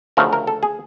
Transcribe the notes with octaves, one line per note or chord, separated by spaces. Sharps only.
D2 C#3 F3 A3 A#4
A#4
A4
G#4